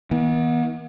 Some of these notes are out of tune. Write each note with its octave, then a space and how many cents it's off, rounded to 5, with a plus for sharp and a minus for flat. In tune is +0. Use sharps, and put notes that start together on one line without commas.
D#3 +45 B3 -40